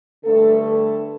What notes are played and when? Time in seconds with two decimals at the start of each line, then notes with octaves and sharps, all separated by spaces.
0.25 G2 D3 A3 A4
0.67 A4